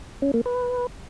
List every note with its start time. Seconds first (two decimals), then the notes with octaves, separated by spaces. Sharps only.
0.22 C#4
0.34 A#3
0.46 B4